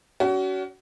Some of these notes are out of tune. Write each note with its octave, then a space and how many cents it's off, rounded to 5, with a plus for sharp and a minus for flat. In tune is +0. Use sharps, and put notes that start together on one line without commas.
C#4 +35 F#4 +30